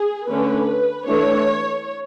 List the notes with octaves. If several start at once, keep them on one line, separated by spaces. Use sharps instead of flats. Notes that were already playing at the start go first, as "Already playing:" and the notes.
Already playing: G#4
D3 A3 C#4 B4
E3 A3 D4 C#5